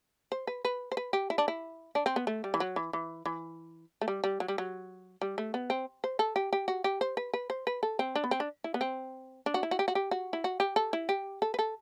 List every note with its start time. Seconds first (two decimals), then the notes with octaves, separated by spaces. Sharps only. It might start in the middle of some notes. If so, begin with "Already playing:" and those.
0.32 C5
0.47 B4
0.65 B4
0.92 C5
0.97 B4
1.13 G4
1.30 E4
1.38 D4
1.48 E4
1.95 D4
2.06 C4
2.16 B3
2.27 A3
2.44 G3
2.54 E3
2.60 F#3
2.76 E3
2.93 E3
3.26 E3
4.01 A3
4.08 G3
4.24 G3
4.40 F#3
4.48 G3
4.58 F#3
5.22 G3
5.38 A3
5.54 B3
5.70 C4
6.04 C5
6.19 A4
6.36 G4
6.53 G4
6.68 F#4
6.84 G4
7.01 C5
7.17 B4
7.34 B4
7.50 C5
7.67 B4
7.83 A4
7.99 C4
8.16 D4
8.24 B3
8.31 C4
8.40 D4
8.64 E4
8.74 B3
8.81 C4
9.46 D4
9.54 F#4
9.63 E4
9.71 F#4
9.79 G4
9.88 F#4
9.95 G4
10.11 F#4
10.33 E4
10.44 F#4
10.60 G4
10.76 A4
10.93 E4
11.09 G4
11.42 A4
11.54 B4
11.59 A4